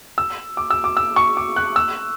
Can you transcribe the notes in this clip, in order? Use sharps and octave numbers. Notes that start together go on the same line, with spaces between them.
E6
D6
E6
D6
E6
C#6
D6
F#6
E6